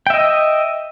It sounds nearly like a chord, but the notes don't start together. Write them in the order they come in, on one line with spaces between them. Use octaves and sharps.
G5 E5 D#5